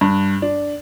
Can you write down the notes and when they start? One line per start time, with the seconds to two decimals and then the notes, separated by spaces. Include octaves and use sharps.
0.01 G2
0.42 D4